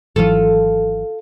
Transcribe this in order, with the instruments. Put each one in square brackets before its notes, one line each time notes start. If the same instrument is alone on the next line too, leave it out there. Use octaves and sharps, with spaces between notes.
[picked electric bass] G#1 E3 F#3 [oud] F4 A4